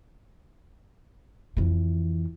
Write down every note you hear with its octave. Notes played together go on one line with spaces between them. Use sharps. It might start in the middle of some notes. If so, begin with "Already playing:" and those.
F2 E3